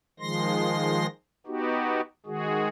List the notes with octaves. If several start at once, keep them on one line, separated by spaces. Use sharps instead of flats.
D#3 F3 G#3 C6 A#6
B3 D#4 F#4 G4
D#3 G#3 F#4 G#4